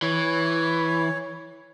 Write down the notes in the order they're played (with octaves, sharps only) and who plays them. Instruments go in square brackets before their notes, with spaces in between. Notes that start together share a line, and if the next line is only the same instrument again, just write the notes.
[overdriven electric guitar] E3 [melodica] C#5